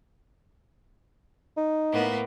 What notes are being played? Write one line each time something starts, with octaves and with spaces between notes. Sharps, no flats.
D#4
A2 A#3 B3